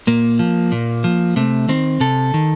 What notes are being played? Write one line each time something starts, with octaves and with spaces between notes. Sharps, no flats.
A#2 A#3
F3
A#2
F3
C3 A3
D#3 C4
C3 A4
D#3